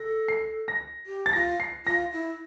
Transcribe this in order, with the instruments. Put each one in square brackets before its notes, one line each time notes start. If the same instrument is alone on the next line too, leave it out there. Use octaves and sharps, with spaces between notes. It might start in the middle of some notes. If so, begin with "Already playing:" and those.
Already playing: [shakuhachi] A4 [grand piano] A#6
[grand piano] C7
A#6
[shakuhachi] G4
[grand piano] A6
[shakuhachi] F4 [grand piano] A#6
[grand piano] C7
[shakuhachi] F4 [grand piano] A#6
[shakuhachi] E4